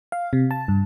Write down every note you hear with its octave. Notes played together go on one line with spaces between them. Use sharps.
F5
C3
A5
G2